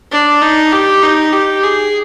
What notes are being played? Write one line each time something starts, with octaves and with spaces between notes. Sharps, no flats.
D4
D#4
G4
D#4
G4
G#4